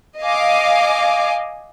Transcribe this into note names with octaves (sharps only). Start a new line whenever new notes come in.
D#5 F5 G#5 D6